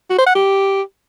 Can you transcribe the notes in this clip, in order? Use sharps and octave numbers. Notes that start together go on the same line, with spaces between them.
F#4
C5
F#5
G4